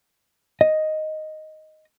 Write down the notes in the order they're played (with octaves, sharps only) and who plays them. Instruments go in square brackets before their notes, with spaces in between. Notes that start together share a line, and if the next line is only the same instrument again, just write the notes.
[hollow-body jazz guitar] D#5